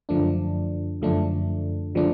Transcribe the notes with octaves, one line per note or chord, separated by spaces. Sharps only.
F#2 D3 F3 A3 D4
F#2 D3 F3 A3 D4
D3 F3 A3 D4